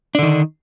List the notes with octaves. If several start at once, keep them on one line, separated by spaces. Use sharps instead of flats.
D3 D#3 D4